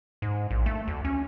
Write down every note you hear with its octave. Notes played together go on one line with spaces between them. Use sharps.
G#2
A#1
A3
D2
C#4